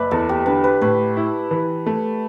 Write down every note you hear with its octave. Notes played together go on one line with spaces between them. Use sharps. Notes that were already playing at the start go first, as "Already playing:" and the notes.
Already playing: F#1 B4 D5 E5
E2 A4
G4
D3 B4
B4
A2 B4
E4
E3
A3